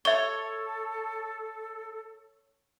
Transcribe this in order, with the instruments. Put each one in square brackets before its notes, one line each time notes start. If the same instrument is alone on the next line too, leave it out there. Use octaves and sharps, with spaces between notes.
[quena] A4 [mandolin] C#5 [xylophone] E5 G7